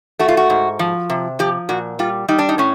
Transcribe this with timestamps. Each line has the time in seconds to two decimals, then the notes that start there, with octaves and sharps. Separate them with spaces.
0.19 A3 F#4
0.28 F4
0.37 F#4
0.50 G#2
0.79 F3
1.10 C3
1.39 F3 G4
1.69 A#2 F#4
1.99 G3 F4
2.28 G3 D#4
2.39 D4
2.49 D#4
2.58 A2 C#4